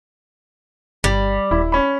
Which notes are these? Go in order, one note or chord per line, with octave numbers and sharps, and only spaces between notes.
G1 G3
D#1 E4
C#4 B5